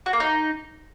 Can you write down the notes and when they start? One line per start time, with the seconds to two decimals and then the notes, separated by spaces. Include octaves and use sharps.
0.06 F#4
0.13 A#3
0.20 D#4